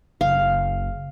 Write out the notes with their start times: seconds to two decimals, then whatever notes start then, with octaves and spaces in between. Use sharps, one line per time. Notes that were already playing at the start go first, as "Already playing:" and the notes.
0.21 F#1 F5